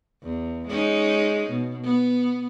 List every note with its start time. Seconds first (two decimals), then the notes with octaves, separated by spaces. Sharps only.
0.22 E2
0.68 G#3 C#4 D#4
1.50 B2
1.83 B3